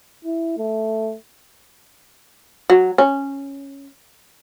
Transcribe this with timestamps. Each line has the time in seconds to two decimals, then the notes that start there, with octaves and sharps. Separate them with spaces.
0.25 E4
0.58 A3
2.70 F#3
2.98 C#4